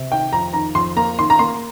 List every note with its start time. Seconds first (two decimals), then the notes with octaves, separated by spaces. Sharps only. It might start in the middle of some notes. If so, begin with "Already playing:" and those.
Already playing: C3
0.11 D#3 G5
0.32 F2 A#5
0.53 D#3 A#5
0.75 F2 C6
0.96 A#3 A#5
1.18 D#3 C6
1.30 A#5
1.39 A#3 C6